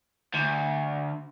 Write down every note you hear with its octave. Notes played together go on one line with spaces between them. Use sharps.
D2